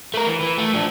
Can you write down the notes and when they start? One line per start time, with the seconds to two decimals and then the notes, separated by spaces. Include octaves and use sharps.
0.14 A3 A#4
0.27 E3
0.41 E3
0.58 A3
0.73 F3 D4